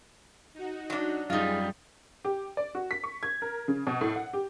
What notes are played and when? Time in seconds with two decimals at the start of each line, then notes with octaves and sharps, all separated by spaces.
0.54 D#4 F#4
0.90 F#3 D4
1.30 F#2 G3 D#4 F4 G#4
2.25 G4
2.57 D5
2.75 F#4
2.91 B6
3.04 C#6
3.23 G#6
3.42 A#4
3.68 C#3
3.87 B2
4.01 A2
4.16 F#5
4.33 G4